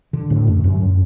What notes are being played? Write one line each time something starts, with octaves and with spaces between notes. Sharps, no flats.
D3
A2
F#2
F#2